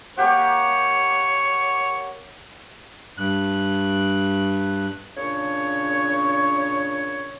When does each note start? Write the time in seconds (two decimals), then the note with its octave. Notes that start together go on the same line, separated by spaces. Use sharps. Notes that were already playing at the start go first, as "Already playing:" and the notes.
0.17 A#3 G4 C#5 F#5
3.18 G2 F#6
5.17 A#2 C#3 D4 C#5